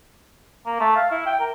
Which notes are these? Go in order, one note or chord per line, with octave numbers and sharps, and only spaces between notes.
A#3
A3
F5
E4
G5
A#4